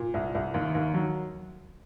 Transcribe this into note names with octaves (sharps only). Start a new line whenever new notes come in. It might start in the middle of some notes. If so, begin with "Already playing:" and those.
Already playing: A#2
C2
C2
D#2
D#2
F#3